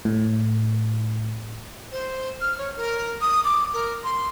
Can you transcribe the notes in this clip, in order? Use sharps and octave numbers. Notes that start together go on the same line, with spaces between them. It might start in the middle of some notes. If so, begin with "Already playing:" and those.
A2
C5
F6
C#5
A#4
D#6
D6
A#4
C6